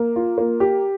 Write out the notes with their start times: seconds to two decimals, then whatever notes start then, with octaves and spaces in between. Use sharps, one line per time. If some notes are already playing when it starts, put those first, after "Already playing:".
Already playing: A#3
0.16 F4
0.38 A#3
0.60 G4